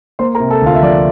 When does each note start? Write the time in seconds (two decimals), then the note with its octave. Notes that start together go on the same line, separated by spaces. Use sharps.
0.19 A#3 C5 C6
0.35 A#4 A#5
0.40 C3
0.50 A4 A5
0.61 D2
0.66 F4 F5
0.75 E5
0.82 F3 D5